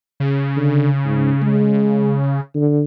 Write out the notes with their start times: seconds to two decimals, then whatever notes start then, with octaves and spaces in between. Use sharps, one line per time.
0.20 C#3
0.57 D3
1.05 G#2
1.42 G#3
2.55 D3